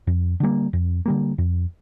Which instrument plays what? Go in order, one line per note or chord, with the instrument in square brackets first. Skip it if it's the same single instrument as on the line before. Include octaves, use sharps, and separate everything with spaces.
[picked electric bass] F2
D3 G3 A#3
F2
D3 G3 A#3
F2